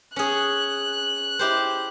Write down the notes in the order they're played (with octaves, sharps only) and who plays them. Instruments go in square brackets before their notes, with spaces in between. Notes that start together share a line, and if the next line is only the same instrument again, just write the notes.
[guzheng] C#4 G#4 [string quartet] F#6
[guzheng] E4 G4 C5